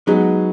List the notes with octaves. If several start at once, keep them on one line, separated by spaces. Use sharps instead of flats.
F#3 G#3 B3 D#4 G#4